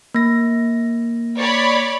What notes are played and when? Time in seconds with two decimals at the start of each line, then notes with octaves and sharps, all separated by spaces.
0.14 A#3 A#6
1.37 C#5 D5 B5